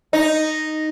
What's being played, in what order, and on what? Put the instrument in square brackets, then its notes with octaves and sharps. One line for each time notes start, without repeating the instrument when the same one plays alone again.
[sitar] D#4